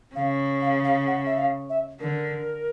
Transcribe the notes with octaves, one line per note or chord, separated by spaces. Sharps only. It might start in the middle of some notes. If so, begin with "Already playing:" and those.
C#3 F5
F5
F5
F#5
E5
F5
E5
D3 A#4